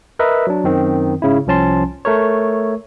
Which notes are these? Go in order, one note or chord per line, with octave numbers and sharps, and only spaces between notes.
A#4 B4 D#5 E5
F#3 D4
F#2 D#3 C4
G#2 C#3 E4
C2 F3 C#4 A5 C6
A3 A#4 C#5